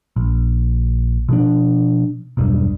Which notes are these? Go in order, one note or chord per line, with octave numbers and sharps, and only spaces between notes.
A#1
B2 F3 D4
E1 B1 G2